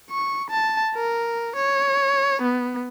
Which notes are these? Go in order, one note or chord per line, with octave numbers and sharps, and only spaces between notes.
C#6
A5
A#4
C#5
B3